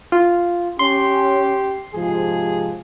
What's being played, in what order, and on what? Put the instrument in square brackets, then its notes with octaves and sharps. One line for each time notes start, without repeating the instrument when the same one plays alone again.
[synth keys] F4
[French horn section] C#4 [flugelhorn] G4 [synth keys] C6
[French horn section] G#2 C3 F3 [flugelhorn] G#4